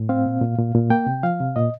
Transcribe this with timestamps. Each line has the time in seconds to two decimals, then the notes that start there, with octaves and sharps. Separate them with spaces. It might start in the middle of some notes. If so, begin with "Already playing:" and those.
Already playing: A2
0.09 C4 F5
0.26 A#2
0.41 A#2
0.58 A#2
0.75 A#2
0.90 A#3 G5
1.07 C3
1.23 F3 F5
1.40 C3
1.56 A#2 D#5